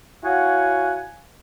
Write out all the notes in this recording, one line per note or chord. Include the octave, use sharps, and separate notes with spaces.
E4 F#4 C#5 F5 F#5 G#5